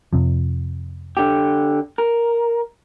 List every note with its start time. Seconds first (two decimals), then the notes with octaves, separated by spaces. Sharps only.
0.13 F2 C3 F3
1.17 D3 G4
1.98 A#4